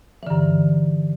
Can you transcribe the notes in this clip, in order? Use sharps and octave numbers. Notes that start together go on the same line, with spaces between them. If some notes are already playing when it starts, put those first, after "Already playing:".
G2 D3 E3